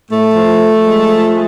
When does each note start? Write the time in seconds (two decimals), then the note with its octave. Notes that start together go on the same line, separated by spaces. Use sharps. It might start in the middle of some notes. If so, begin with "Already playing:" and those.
0.09 A2 A3
0.34 F3
0.59 F3
0.84 G#3
1.08 F3
1.32 G#3